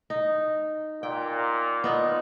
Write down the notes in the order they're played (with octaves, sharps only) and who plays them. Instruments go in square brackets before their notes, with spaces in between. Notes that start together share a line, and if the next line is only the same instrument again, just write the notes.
[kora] D#4
[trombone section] A#2 [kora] G5
[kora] B3 D#4 F4